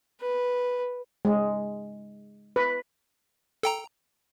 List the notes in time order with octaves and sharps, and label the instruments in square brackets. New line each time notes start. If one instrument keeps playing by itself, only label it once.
[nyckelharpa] B4
[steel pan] G#3
B4
[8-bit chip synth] A4 G5 A#5